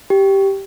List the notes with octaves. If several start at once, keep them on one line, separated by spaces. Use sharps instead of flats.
G4